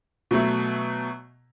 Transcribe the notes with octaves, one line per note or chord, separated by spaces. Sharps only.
B2 F#3 A3